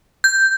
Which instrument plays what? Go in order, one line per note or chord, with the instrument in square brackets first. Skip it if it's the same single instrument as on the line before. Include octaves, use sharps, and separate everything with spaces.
[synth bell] G6